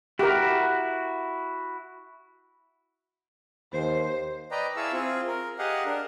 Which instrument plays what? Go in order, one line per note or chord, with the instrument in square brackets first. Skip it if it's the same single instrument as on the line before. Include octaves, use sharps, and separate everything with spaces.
[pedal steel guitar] E4 F#4 [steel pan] G4 A#4
[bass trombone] D#2 [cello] C5
[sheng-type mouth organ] B4 D5 D#5 G5 A#5
E4 G#4 F5 A5 C#6 E6
C4 F4 G#4
A#4
G4 G#4 D#5 F5 F#5
D4 A#4